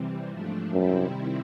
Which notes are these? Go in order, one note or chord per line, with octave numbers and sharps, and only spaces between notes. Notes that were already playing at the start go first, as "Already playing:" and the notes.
Already playing: C3 E3 G3 C4
G#2 F3 A3 D4
F#2 C3 D#3 G3 C4 E4